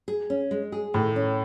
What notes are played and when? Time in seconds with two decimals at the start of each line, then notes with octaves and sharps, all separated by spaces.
0.08 G#4
0.30 C#4
0.51 G#3
0.72 G#4
0.94 A2 D#3
1.16 C#4